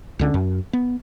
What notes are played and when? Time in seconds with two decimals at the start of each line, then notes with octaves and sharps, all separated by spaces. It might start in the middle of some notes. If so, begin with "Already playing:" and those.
0.19 C#2 D3 C#4
0.34 F#2
0.73 B3